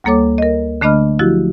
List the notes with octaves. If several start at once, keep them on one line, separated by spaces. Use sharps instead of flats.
D2 G3 A#3 A4 C#5 D6
A#4 D#5
D3 A3 D4 D#5 B5 F6
F3 F#3 E4 F#4 G4